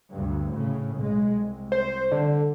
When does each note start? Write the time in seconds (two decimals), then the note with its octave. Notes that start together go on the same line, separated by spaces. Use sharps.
0.12 D2 G2
0.54 A2 C#3
0.97 B1 G#3
1.34 C2
1.72 C5
2.12 D3